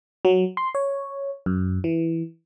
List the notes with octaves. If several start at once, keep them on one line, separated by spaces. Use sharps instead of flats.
F#3
C6
C#5
F#2
E3